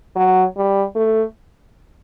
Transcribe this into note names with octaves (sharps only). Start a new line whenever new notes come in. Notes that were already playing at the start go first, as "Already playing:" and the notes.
F#3
G3
A3